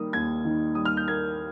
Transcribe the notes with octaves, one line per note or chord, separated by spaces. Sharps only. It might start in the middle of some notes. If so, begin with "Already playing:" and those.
Already playing: D#3 G3 A#3 D#6
D#2 G#6
D#3
G3 D#6
F6
G6
A#3 G#6